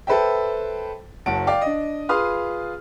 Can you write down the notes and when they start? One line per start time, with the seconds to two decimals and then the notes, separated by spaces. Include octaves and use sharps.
0.07 A4 B4 C5 E5 G5
1.26 F#1 F#3 F#5 A5 D7
1.47 D5 F5 G5 D6
1.61 D4 D#5
2.09 F4 G#4 B4 C6 D#6 F6